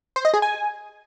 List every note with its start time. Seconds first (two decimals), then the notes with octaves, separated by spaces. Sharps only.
0.16 C5
0.25 D#5
0.34 G#4
0.42 G#5